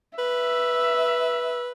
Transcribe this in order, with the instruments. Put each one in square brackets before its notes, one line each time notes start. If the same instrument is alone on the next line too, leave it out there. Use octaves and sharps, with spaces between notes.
[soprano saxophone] B4 [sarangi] E5